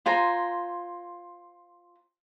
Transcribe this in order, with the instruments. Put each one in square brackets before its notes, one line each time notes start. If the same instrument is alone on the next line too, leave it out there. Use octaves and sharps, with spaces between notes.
[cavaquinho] F4 C5 G#5 A#5